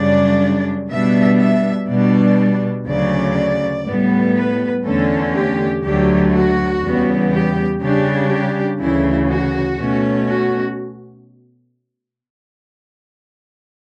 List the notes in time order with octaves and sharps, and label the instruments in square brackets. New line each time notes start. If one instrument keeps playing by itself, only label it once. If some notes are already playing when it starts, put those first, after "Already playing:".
Already playing: [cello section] F#2 C#3 G3 D4 D5
B2 G3 B3 D4 E5
E5
B2 G3 D4 D5
D2 C#3 F#3 D5
A2 G3 B3
B4
E2 D3 A3 C#4 A4
G4
D2 D3 F#3 A3 G4
F#4
E2 C#3 G3 B3
G4
C#3 G3 D4 G4
G4
D2 C#3 E3 E4
F#4
B2 A3 C#4
F#4